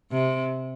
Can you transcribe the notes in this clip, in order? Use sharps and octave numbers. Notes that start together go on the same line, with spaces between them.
C3